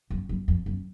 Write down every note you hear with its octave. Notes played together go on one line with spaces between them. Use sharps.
F#2
F#2
F2
F#2